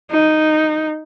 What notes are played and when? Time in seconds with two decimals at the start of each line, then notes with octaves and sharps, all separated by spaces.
0.11 D#4